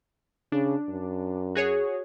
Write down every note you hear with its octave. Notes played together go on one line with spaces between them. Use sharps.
C#3 D4
F#2
F#4 G#4 C#5